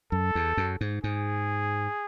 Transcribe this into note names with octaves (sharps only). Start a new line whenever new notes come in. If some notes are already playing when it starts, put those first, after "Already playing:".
F#2 A4
E2
F#2
G#2
G#2 G#4